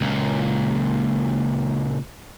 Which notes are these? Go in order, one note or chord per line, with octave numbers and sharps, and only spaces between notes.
C#2 A#2